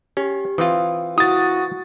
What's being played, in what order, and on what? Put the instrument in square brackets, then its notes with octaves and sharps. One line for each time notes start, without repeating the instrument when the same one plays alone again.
[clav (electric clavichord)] C#4 [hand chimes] G4
[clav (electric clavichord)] E3 C4 F4 [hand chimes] D#6
[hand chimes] E4 [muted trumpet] F#4 [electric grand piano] D#6 A6